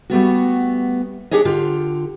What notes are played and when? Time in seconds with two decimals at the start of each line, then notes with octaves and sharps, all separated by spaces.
0.10 G3 A3 B3 F#4
1.31 D4 D#4 G4 G#4 C#5 D#5
1.45 D3 F4 G4